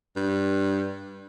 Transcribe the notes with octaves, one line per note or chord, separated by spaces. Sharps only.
G2